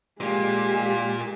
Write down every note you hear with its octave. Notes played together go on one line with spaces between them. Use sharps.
A#2 G#3 A#3 G4